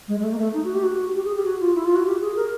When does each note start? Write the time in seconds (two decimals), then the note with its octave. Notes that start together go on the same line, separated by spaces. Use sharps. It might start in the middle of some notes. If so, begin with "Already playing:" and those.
0.08 G#3
0.20 G#3
0.24 A3
0.33 A#3
0.38 A3
0.54 D#4
0.64 F#4
0.75 G4
0.84 F#4
1.14 G4
1.25 G#4
1.36 G4
1.45 F#4
1.60 F4
1.75 E4
1.85 F4
1.95 F#4
2.06 G4
2.21 G#4
2.36 A#4